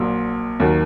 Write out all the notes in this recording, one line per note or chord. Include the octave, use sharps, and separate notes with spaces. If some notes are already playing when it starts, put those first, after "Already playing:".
Already playing: A#1 A#2 F#3
D#2 D#3 F#3 F#4